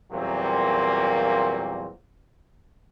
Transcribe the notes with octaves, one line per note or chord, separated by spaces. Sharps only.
E2 A#2 F#3 G3 A#3 C4